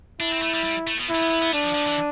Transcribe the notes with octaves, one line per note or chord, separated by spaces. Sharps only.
D4 E4
C4
A3
G3
G3
A3
B2
E4
A3
B3
B3
B3
A3 D4
F3
F3
E3